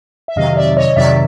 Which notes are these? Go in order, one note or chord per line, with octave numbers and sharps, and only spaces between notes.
E5
F2 C3 D#3 F#3 D#5 F5
D5 E5
C#5 D#5
F2 C3 D#3 F#3 D5 E5